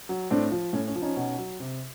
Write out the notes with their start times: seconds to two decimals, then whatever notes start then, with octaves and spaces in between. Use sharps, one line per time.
0.09 F#3
0.30 A2 C4 D4
0.52 F3
0.73 A2 C#4
0.88 C#4
0.96 F3
1.02 C#4 D#4
1.16 B2
1.38 F#3
1.60 C3